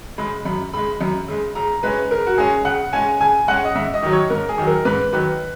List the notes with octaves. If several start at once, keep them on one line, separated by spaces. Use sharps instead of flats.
C#3 G#3 B5
F#2 B5
C#3 G#3 B5
F#2
C#3 G#3
C#3 A#5
G#3 C#4 B4
C#3 A#4
F#4
G#3 C#4 G#4
C#3 F#5
G#3 C#4 G#5
C#3 G#5
G#3 C#4 F#5
D#5
G#2 E5
D#5
D#3 F#3
C#5
G#2 A#4
G#4
D#3 F#3
A#4
G#2 B4
D#3 F#3 B4